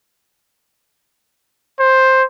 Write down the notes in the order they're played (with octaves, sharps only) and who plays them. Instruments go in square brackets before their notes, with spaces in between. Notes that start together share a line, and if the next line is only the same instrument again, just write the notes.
[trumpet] C5